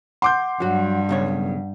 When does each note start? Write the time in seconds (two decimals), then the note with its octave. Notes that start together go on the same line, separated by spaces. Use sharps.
0.22 F#5 C6 D6 G6
0.60 G2 F#3 F#4
1.09 B1 C#3 C#5